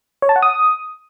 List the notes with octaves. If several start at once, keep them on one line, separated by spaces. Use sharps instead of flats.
C#5
A5
F#5
D#6